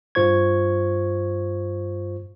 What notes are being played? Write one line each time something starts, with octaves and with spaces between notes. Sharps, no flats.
G2 F4 C5 C#6 G#6